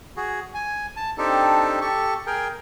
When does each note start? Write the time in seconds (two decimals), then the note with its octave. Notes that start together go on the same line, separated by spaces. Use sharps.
0.17 F#4 G#4
0.54 G#5
0.96 A5
1.18 C4 D4 D#4 G4 A4
1.81 G4 A4 C#6
2.27 G#4 A#4 G5